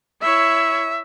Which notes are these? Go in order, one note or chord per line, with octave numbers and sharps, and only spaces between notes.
E4 C#5 E5